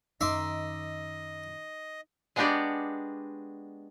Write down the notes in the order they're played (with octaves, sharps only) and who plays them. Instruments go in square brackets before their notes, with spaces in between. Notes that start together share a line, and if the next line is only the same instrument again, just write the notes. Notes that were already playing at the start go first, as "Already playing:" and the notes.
[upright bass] F#2 D#3 [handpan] D#4 [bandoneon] D#5 [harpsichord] E5 C6 D6
[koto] G#3 B3 D4 F#4 G4 D5